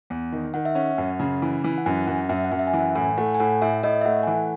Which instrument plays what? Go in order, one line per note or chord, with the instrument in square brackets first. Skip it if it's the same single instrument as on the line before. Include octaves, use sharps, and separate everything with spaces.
[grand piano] E2
D#3
[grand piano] D#3 [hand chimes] F#5
[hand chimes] E5
[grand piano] C#4 [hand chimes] F#5
[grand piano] F#2
C#3
E3
E3
[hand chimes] F#5
[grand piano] F#2 [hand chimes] G#5
[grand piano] F#2 [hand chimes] F#5
[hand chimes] F#5
[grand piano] F#2 [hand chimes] E5
[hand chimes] F#5
[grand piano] F#2
[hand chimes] E5
G#5
[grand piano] E3 [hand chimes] F#5
[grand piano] A2 [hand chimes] G#5
[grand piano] A3 [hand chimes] F#5
[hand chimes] G#5
[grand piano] A2 [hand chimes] F#5
[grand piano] A2 [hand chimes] E5
[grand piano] A2 [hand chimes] D#5
[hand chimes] E5
[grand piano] A3 [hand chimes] F#5
[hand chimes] G#5
[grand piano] E3 [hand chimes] F#5